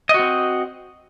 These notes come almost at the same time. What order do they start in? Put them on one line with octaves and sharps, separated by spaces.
D#5 F#4 C4